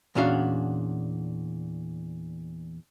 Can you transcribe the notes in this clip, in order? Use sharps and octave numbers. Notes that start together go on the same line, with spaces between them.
E2 A#2 C#4 D4 F#4 F5